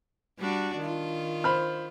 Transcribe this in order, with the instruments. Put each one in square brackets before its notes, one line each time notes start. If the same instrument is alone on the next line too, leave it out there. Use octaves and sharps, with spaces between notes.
[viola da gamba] G3 D4 F#4
D#3 F4
[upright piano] C5 B5 F6